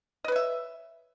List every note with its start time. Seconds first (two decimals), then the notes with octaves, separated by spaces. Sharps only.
0.24 D#5
0.28 B4
0.32 C#5
0.36 E5